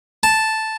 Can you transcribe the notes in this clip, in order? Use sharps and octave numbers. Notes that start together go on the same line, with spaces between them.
A5